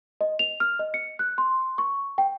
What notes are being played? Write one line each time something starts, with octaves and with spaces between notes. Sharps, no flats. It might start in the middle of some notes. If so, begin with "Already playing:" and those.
D#5
F7
F6
D#5
C#7
F#6
C6
C#6
G5